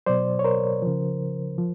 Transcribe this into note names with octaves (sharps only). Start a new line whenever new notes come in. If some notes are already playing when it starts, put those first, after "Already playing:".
B2 F#3 C5 D5
C#5
A#4 C5
C#3 F3
F3